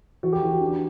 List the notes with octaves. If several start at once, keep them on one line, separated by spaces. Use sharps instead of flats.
E3 F#4
G4
E3
F#4
D4